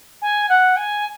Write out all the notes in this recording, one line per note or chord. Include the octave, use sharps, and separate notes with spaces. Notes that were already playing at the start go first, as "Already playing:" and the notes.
G#5
F#5
G#5